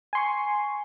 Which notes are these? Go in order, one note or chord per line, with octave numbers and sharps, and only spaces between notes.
G#5 C6 C#6